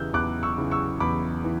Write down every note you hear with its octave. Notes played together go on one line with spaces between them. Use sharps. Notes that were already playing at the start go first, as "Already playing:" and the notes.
Already playing: E2 C#3 E3 E6 F#6 G6
E2 D6 F#6
C#6 E6
C#3 E3
C#6 E6
E2 B5 D6
E3